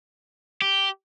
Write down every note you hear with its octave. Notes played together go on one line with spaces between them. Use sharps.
G4